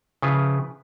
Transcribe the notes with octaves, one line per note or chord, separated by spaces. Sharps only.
C#3 F3 E4 F4 B4